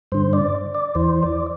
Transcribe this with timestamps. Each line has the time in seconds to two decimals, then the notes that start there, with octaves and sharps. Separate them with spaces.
0.12 G2 D3 C5
0.33 D5
0.75 D5
0.95 E2 E3 C5
1.23 D5